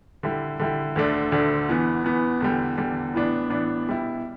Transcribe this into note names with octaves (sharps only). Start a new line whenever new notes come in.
D3 G3 E4
D3 G3 E4
D2 D3 A3 D4
D2 D3 A3 D4
E2 E3 B3
E2 E3 B3
E2 D3 G3
E2 D3 G3
A2 E3 B3 D4
A2 E3 B3 D4
B2 G3 E4